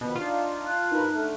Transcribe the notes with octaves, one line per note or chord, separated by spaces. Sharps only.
B2 D#3 F3 B4
D4 D#4 F4
A5 F6 F#6
G2 D#4 A#4 B4
D3 A3